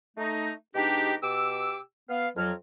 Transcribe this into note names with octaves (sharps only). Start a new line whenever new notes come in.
A3 D#4
B2 G#3 D4 D#4 G4
B2 G4 D6 E6
B3 F5
F2 F#3 F6